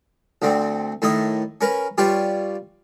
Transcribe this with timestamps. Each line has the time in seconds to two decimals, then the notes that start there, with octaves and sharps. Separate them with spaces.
0.42 D2 D3 C4
1.02 A2 D#3 E4 D#5
1.61 C#4 A#4 B4
1.98 G3 F4 G4 B4 C#5